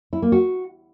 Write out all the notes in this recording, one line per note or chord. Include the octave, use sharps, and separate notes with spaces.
E4
A#3
F#4